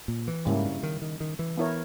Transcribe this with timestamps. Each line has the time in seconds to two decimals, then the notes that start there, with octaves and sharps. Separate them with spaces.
0.08 A#2
0.28 E3
0.45 G#2 C#3 G3 A#3 C#4 E4
0.65 G2
0.83 D#3
1.02 D#3
1.20 D#3
1.39 E3
1.57 B3 E4 A#4 C#5